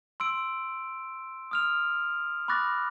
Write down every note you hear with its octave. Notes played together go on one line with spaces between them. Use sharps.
C6 E6 D7
D#6 F6 F7
B5 C#6 D6 F#6 A6 A#6